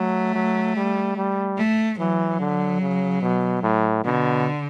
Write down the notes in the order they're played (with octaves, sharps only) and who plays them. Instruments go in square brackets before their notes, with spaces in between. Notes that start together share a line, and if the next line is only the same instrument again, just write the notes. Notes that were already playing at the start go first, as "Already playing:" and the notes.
Already playing: [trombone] F#3 [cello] A3
[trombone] F#3
G3
G3
[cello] A3
[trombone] E3 [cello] F#3
[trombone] D3
C#3
B2
A2
[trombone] B2 [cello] D3